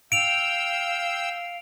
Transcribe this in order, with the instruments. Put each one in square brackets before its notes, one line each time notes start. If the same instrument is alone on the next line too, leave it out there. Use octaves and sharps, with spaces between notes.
[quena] F5 [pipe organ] G5 E6 [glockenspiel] D7 F7